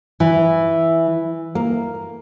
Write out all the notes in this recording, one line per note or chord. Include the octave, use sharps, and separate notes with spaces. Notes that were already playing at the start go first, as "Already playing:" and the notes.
E3
A#3